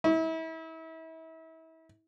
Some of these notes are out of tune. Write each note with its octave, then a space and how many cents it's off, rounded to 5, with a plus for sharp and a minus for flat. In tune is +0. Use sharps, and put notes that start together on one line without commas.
E4 -35